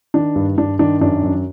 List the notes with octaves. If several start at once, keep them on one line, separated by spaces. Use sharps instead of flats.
D#3 D4
G2
G2 D4
D#3 D4
F#2 D4
F#2